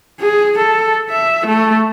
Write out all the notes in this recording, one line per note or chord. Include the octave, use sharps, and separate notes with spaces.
G#4
A4
E5
A3